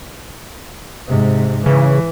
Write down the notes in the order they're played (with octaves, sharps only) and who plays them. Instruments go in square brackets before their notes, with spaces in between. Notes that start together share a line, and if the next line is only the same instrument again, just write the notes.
[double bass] G#2 C3
[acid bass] C#3 [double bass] E3